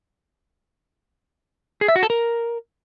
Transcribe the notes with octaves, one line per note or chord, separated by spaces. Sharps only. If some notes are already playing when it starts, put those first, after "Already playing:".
G#4
E5
F#4
A4
A#4